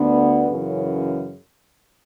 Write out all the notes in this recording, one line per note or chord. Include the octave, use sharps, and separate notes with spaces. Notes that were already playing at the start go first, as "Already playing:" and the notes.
Already playing: D2 D3 B3
F#2 C#3 E3